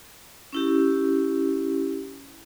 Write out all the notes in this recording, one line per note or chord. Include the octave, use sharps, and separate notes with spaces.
C#4 E4 G4